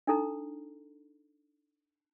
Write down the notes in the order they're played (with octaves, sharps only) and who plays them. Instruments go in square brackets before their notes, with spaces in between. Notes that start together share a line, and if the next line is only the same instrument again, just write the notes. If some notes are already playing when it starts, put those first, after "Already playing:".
[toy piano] D4 D#4 A4 A#5